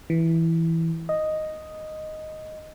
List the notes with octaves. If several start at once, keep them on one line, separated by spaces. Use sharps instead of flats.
E3
D#5